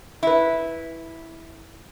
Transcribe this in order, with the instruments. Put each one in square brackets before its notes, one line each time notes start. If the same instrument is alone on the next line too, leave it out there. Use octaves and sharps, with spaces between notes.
[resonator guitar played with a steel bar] E4 B4